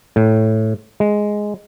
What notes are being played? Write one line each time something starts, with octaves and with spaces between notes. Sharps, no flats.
A2
G#3